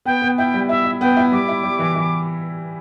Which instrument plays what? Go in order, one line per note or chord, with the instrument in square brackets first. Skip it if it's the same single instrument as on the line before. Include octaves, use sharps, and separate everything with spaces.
[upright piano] B3 [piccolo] G5
[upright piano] B3
[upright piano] E4 [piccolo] G5
[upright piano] G3
[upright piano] E4 [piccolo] E5
[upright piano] E4
[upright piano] B3 [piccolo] G5
[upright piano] E4
[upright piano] G3 [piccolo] D6
[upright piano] E4
G3
E3
E3